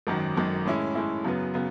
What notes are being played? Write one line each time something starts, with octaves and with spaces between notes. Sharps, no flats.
G#1 F#2 D#3 F#3
G#1 F#2 D#3 F#3
A2 G#3 C#4 E4
A2 G#3 C#4 E4
F#2 C#3 F#3 B3
C#3 F#3 B3